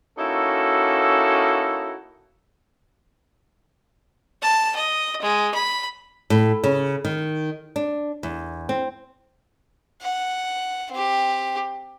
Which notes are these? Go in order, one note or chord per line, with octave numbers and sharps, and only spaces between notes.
A#3 C#4 D#4 E4 F#4 A4
A5
D#5
G#3
B5
A2
C#3
D#3
D4
E2
C4
F#5
C4 G4